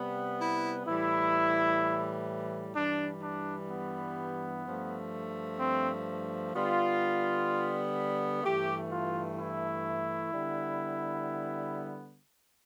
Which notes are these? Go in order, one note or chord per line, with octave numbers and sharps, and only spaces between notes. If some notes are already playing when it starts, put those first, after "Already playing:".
Already playing: C3 G3 B3
E4
A2 E3 G3 E4
G2 E3 G3 D4
D4
B3
G2 F3 A3
C4
D3 G3 B3 F4
G2 E3 A3 G4
F4
E4
D3 G3 B3